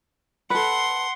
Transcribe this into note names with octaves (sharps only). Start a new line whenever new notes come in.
A4 B4 F#5 C6